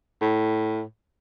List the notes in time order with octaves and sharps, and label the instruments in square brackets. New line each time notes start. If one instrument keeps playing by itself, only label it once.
[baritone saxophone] A2